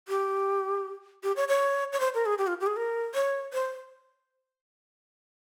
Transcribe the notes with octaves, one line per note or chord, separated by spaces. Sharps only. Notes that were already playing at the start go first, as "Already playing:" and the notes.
G4
G4
C#5
C#5
C#5
C5
A#4
G#4
G4
F4
G4
G#4
A#4
C#5
C5